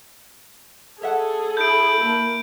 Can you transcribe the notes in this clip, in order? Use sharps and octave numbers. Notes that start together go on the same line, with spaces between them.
G#4 A4 C#5 E5 F#5
E4 G6 D7
A#3 A4